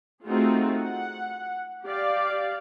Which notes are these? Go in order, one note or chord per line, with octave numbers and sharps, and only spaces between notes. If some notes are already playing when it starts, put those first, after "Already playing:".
A3 C4 D#4 F4 F#4 G#4
F#5
G4 D5 F5